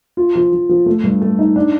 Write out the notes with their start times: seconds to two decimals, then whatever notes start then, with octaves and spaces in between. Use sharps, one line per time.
0.17 F4
0.35 F3
0.53 F3
0.69 F3
0.86 A3
1.03 G2
1.22 A3
1.39 D#4
1.56 D4